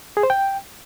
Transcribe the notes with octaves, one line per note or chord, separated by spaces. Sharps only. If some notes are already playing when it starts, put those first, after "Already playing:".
G#4
C5
G5